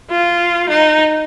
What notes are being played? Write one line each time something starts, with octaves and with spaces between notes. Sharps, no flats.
F4
D#4